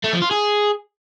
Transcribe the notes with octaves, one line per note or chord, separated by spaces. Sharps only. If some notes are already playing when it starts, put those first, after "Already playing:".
A3
F3
F4
G#4